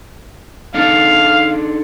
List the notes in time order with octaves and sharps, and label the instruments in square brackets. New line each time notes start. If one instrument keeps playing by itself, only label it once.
[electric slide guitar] D4 D#4 A4 [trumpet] F5